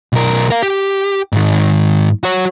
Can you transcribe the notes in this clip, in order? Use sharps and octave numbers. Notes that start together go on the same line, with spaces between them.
B1 A#4
A#4 F5
G4
G#2 D#3
F#4 C#5